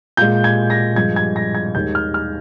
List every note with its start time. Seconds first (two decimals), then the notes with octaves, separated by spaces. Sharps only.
0.17 A#2 G#3 G6
0.44 G#6
0.70 A#6
0.96 G2 F3 G#3 G#6
1.16 G#6
1.36 A#6
1.55 G#6
1.75 D#2 D#3 G#3 G6
1.95 F6
2.14 F6